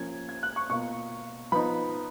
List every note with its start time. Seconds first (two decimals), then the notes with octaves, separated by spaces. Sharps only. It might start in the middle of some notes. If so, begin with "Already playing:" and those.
Already playing: F3 A#3 C#4 G#6
0.29 G#6
0.43 F#6
0.56 C#6
0.70 B2 A#3 F4 C#6
1.52 F3 B3 D#4 B5